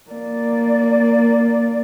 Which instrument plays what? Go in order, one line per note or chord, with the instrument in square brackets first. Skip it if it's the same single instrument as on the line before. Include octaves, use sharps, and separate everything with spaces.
[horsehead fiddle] A#3 D5